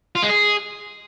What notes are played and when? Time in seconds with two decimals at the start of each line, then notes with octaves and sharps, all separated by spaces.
0.15 F4
0.22 G#3
0.29 G#4